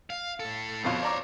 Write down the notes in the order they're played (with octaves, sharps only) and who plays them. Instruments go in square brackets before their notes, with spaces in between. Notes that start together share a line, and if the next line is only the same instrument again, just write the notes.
[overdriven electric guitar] F5
A2 A4
[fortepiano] F2 B2 F4 [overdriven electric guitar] C5 C#5
[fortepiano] D5 A#5 D6